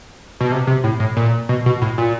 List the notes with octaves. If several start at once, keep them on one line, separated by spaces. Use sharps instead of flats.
B2
C3
C3
A2
A2
A#2
B2
B2
A2
A#2